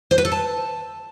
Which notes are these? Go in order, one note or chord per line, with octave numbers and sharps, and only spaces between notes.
C5
B4
A4
A5